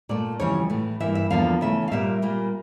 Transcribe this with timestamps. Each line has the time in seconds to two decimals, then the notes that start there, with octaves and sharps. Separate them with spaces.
0.09 A#2 A3 D5
0.40 F2 C#3 E3 G3 C#5
0.70 A2 E3 A3
1.00 G2 E3 A#3 E5
1.15 E5
1.30 E2 D3 F3 A#3 F5
1.61 C#3 E3 A3 E5
1.88 F5
1.91 A#2 G3 A#3 E5
2.22 A#2 G3 A#3